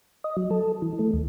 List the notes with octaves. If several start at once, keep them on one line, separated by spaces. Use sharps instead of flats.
D#5
F#3
A4
E3
A3
D#2